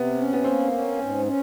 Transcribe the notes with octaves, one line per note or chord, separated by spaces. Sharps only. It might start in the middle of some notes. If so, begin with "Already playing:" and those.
Already playing: C3 B3
C#4
B3
A#3 C4
C#4
G#2
C#4